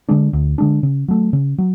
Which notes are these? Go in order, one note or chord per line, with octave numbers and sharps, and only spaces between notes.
D3 G#3 D4
D2
D3 G#3 D4
C#3
F#3 A3
C#3
F#3